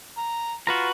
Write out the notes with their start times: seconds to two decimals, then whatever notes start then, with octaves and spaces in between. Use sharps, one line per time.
0.17 A#5
0.67 F4 F#4 B4 A#5